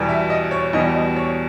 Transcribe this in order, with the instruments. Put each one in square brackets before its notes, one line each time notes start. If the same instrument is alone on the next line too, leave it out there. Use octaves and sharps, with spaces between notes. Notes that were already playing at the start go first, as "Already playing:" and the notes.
Already playing: [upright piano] E2 B2 G3
E5
D#5
C#5
E2 B2 G3 D#5
D#5
C#5